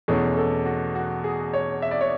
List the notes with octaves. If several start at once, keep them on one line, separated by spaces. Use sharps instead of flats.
E2 B2 A3 C#4 G#4
A4
F#4
F#4
G#4
C#5
E5
D5
C#5